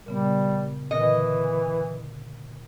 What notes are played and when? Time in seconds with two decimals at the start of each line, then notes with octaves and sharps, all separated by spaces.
0.06 A#2 C#3 G3 B3
0.91 A#2 D3 E3 D#5